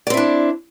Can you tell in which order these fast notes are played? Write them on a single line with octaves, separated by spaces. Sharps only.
D5 C4 E4 D4